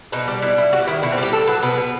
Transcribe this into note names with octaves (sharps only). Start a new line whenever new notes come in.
B2 D#4
G3
B2 E4
B2 E4
G3 F#4
D#3 E4
B2 E4
C4
G3 G4
A2 A4
F#3 B4
B2 B4
B2